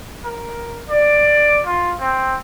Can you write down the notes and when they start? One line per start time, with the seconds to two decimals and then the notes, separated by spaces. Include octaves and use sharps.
0.24 A#4
0.89 D5
1.66 F4
2.00 C4